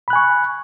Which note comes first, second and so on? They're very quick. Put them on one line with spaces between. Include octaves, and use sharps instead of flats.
B5 F#6 G#5 C#6